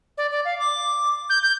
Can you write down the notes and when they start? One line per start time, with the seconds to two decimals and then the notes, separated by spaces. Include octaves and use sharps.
0.18 D5
0.31 D5
0.45 F5
0.59 D6
1.30 G6
1.43 G6